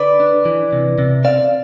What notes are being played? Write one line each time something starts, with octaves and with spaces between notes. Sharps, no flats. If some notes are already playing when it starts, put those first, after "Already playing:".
Already playing: D3 B4 D5
D4
E3
C3
C3
C4 D5 F5